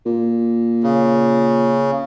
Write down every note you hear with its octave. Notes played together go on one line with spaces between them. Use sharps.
A#2
C#3